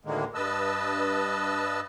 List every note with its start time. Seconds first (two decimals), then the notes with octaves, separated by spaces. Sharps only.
0.05 D2 A2 D3 D#3 G#3 A#3
0.34 G2 B4 D#5 A5 E6